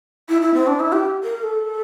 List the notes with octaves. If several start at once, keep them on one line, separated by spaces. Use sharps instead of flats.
E4
E4
C4
D4
E4
G4
A#4
A4